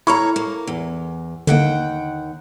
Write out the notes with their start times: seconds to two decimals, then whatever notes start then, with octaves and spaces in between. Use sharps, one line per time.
0.07 E4 A4 C#5 A#5 C#6 F6
0.36 A#3
0.67 E2
1.47 D#2 D3 A#3 F#5 G5